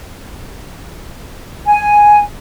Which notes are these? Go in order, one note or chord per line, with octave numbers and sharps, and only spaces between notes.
G#5